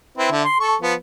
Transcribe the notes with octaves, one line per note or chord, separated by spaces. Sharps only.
C4 E4 B4
D3 E5
C6
A4 C#6
F3 B3